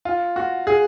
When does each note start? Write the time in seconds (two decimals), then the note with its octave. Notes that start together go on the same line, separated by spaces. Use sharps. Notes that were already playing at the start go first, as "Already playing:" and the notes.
0.05 F4
0.36 F#4
0.67 G#4